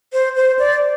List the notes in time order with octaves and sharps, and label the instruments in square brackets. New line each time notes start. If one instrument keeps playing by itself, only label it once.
[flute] C5
C5
D5